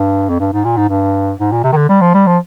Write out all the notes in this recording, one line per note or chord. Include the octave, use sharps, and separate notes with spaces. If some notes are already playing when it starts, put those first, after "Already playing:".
Already playing: G2
F2
G2
G#2
A#2
G#2
G2
G#2
A#2
C3
D#3
D3
G3
F3
G3
F3